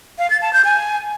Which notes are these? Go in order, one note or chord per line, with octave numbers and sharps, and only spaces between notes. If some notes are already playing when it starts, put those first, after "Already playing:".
F5
A6
A5
G6
G#5